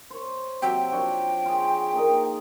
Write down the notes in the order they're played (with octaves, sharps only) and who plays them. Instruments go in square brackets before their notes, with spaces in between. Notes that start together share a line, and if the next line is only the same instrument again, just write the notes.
[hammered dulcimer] C5 C#5
[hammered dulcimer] C3 F#3 E5 [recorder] G5
[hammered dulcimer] F3 D4 C#5
F4 G#4
A#3 D#4 D#5